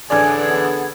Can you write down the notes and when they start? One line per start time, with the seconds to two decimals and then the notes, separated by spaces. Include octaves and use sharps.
0.10 A1 D3 D4 G#4 B4 D5 G#5 G#6
0.50 B3